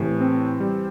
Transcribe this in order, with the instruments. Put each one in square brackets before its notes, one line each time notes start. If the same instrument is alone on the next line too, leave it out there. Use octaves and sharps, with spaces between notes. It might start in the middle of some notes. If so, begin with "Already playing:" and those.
Already playing: [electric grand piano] A2 [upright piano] C3 E3
[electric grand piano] C4
G3